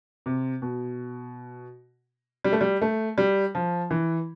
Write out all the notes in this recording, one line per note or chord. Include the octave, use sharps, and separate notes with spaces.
C3
B2
G3
A3
G3
A3
G3
F3
E3